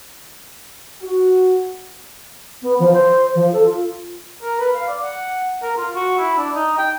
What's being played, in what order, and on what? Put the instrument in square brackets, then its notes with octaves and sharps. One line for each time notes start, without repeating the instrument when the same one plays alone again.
[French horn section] F#4
[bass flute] B3
F3
C5
F3
A4
F4
[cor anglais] A#4
B4
F5
D5
F#5
A#4
F4
F#4
E4
D4
D#4
G5